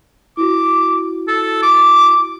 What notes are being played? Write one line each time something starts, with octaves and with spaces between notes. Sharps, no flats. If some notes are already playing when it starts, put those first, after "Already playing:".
E4 F#4 D6
A4
D6